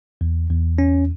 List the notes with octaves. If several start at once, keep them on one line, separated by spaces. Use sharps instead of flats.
E2
E2
C#4